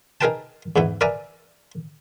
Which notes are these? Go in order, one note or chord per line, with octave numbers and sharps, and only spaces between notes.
D#4 G#4 A#4 B4 G5 A5
E2 G#2 B3 E4
A#4 B4 D5 E5 G#5 A#5